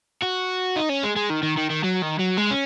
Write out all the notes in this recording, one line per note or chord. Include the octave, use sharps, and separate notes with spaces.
F#4
D#4
C#4
G#3
G#3
D#3
D#3
D#3
D#3
F#3
D#3
F#3
G#3
C#4